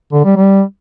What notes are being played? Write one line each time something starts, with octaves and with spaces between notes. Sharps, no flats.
D3
G3
G3